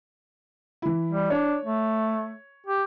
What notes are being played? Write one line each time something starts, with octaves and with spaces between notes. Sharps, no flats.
E3 E4
G3
D4 C#5
A3
G4